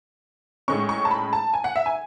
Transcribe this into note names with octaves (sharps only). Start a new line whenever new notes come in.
A2 G#3 C#4 C#6
C#6
A5
B5
A5
G#5
F#5
E5
G#5